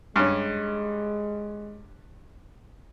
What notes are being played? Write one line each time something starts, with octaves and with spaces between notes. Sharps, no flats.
G2 G#3 C#4